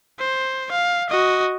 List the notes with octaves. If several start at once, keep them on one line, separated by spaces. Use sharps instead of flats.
C5
F5
F#4 D#5